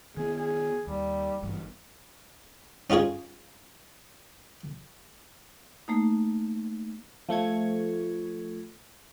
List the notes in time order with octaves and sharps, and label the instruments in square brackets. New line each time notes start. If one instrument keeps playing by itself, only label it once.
[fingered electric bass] D#3 B3 [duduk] G#4
[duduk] G#4
[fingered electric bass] D#2 [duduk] G3
[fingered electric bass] G#1 G2 E3
[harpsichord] C#4 D#4 F4 G#4 C#5
[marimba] A3 A#3 D#4
[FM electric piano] F3 A3 C#6 G#6